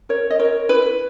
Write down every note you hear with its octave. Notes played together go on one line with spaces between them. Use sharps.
A#4 C#5
D#5
A#4 C#5
E4 B4